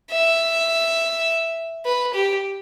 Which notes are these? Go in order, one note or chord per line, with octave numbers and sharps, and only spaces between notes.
E5
B4
G4